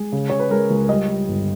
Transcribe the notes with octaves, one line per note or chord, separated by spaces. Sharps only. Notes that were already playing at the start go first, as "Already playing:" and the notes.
Already playing: G#3 G#4
C#3
C#3 C#5
B4
G#3 A#4
C#2
G3 D#5
G3
G1